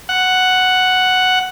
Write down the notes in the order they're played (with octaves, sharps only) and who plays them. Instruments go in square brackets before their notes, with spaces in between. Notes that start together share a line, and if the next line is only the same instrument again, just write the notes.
[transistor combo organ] F#5